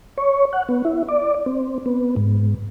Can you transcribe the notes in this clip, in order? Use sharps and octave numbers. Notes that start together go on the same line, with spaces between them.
C#5
F#5
B3
E4
D5
C4
B3
G#2